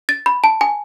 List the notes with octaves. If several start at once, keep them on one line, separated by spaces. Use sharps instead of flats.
A6
B5
A5
G#5